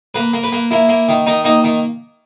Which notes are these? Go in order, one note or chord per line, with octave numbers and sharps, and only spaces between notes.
A#3 B4
A#3
B4
A#3
A#3 E4
A#3
D#3
D#3 D#4
A#3 D#4
D#3